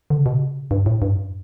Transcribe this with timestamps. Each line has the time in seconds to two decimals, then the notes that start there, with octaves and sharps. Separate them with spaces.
0.10 D3
0.18 C#3
0.26 B2
0.34 C#3
0.71 G2
0.86 A2
1.02 G2
1.17 F#2